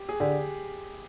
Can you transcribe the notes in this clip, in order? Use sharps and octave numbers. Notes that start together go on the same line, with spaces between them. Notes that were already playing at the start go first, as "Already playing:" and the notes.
Already playing: G4
G#4
D3 G4